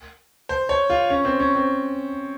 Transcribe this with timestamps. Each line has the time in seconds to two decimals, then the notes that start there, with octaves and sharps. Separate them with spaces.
0.49 C5
0.69 C#5
0.90 F4
1.10 C#4
1.25 C4
1.40 C#4
1.55 C4